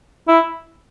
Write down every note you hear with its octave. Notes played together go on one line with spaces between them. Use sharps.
E4